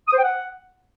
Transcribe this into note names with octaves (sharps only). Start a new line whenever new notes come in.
D#6
C5
G5
F#5